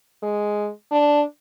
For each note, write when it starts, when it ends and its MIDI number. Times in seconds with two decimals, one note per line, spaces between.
0.22 0.68 56
0.91 1.22 62